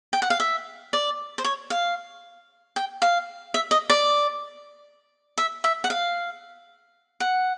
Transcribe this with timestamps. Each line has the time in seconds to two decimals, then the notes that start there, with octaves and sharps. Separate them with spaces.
0.13 G5
0.22 F#5
0.30 F5
0.40 E5
0.93 D5
1.38 C5
1.44 C#5
1.70 F5
2.76 G5
3.02 F5
3.54 E5
3.71 D#5
3.90 D5
5.38 E5
5.64 E5
5.84 F#5
5.90 F5
7.20 F#5